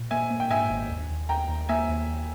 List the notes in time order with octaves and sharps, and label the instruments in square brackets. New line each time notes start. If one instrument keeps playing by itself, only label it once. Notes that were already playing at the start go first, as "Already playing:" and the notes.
Already playing: [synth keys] A#2
[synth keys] A#3 [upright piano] E5 G#5
[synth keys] A#3
[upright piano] G5
[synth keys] G#2 [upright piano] E5 G#5
[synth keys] G#1
D#2
D#2
[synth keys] D#2 [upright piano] G5 A#5
[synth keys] D#2
[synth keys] A#3 [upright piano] E5 G#5
[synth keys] D#2
D#2